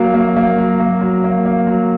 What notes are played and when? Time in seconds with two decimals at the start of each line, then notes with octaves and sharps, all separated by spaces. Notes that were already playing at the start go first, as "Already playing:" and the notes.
Already playing: F#3 A#3
0.14 A#3
0.36 A#3
0.58 F#3
0.80 A#3
1.01 F#3
1.24 A#3
1.46 A#3
1.67 F#3